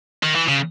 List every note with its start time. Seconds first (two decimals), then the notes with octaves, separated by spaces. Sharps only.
0.23 D#3
0.35 E3
0.48 C#3